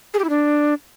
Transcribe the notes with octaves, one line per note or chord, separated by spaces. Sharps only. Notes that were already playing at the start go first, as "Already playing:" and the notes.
G#4
G4
E4
D4